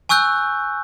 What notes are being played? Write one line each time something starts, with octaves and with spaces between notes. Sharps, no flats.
G#5 C#6 E6 F#6 G6